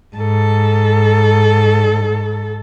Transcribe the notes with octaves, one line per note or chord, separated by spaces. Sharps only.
G#2 A4